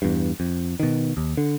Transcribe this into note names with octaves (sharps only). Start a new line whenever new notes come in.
E2 G2
F2
B2 D#3
D#2
D3